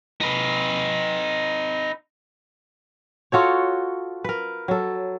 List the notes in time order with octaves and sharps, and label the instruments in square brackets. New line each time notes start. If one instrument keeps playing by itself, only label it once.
[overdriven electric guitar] D#4 B4
[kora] F4 F#4 A4 C#5
A#4 B4
F#3 A4